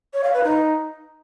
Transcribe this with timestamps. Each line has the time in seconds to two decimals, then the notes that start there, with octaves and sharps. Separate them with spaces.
0.13 C#5
0.24 F5
0.34 B4
0.44 D#4